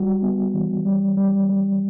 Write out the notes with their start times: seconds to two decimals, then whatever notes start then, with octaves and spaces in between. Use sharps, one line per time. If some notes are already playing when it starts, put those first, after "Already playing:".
Already playing: G3 F#4
0.23 B3
0.54 E3
0.85 G3
1.17 G3
1.49 G3